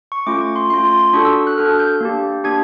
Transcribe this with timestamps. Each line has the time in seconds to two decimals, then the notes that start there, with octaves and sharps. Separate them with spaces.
0.12 C#6
0.27 A3 C#4 F4 D6
0.41 C#6
0.56 C6
0.70 A3 C#4 F4 C6
0.84 C6
0.99 C6
1.13 D4 F#4 A4 C#6
1.25 E6
1.47 F#6
1.57 D4 F#4 A4 F6
1.79 G6
2.00 A#3 D4 G4
2.44 A#3 D4 G4 G#6